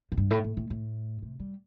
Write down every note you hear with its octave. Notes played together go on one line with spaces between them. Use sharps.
A2
G2
A2
A2
A2
A2
C3
G3